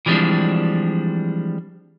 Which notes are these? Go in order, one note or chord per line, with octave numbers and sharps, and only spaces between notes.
E3 F3 G3 G#3 C4 D4